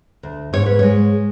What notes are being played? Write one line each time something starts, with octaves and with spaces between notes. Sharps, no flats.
D2
G#2 C#5
B4
G#3 C#5